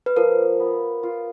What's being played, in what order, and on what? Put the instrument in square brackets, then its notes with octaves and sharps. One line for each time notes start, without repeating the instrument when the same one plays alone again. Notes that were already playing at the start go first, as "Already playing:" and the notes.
[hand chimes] B4
[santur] F3 [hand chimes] A#4
[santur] B3
F4